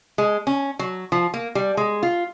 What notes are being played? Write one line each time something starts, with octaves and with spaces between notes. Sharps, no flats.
G#3
C#4
F#3
F3
A#3
G3
G#3
F4